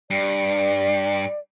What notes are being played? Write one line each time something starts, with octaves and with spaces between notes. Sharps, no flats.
G2 D5